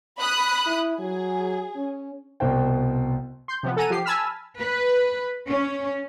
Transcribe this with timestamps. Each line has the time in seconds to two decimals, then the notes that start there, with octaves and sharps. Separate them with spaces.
0.19 B5 D#6 F#6
0.67 E4
0.99 F#3 G#4
1.76 C#4
2.40 C2 B2 C5 G5
3.48 C6 G6
3.63 C3 F3 B3
3.77 A4 F#5 G#5 A#5 D#7
3.90 F3 G4 C7
4.05 G#5 A5 B5 E6 F6 B6
4.58 B4
5.49 C#4